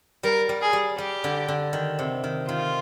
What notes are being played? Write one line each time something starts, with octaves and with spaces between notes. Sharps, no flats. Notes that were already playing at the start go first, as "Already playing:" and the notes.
G3 A#4
G3
G#4
G3
G3 G4
D3
D3
D#3
C3
D#3
D#3 F4